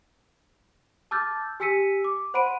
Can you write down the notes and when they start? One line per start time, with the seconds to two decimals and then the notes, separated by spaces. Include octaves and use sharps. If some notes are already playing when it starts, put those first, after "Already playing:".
1.11 A5 D6 E6 F6 G6 A6
1.60 G4 G#5 E6 B6 C#7 D#7
2.04 D6
2.34 C5 F#5 B5 C6 D7 D#7